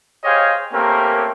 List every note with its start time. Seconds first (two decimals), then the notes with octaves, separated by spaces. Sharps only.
0.24 G4 G#4 C5 C#5 D#5 F5
0.73 A3 A#3 C4 C#4 G4 A#4